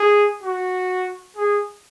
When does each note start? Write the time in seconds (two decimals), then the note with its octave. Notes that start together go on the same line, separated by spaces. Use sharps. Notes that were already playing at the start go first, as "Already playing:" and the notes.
Already playing: G#4
0.43 F#4
1.36 G#4